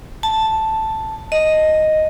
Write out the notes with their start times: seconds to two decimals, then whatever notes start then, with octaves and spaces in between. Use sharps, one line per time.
0.23 A5
1.32 D#5